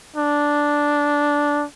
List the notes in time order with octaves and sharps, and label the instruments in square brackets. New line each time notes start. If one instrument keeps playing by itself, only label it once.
[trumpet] D4